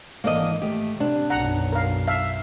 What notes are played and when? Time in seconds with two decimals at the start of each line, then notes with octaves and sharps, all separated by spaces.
0.24 G#1 E3 A#3 D4 D#5
0.62 A3 G4
1.00 C3 D4
1.30 B1 F#2 F#5 A#5
1.72 A#4 F5
2.08 E5 F5 A5